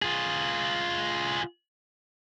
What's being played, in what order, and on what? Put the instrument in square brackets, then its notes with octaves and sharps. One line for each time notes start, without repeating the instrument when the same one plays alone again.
[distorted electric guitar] F4 G#4